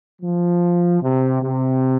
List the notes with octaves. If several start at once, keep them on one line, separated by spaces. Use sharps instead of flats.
F3
C3
C3